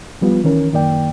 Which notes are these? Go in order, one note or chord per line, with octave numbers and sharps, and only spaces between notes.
F3 G3 B3 F4
D#3 E3 C#4 A#4
F#2 D#3 A#3 D5 G5